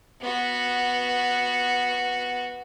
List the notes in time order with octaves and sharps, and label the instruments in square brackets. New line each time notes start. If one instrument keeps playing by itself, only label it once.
[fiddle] B3 F#4